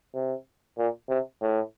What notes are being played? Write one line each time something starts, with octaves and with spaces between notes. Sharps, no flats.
C3
A#2
C3
A2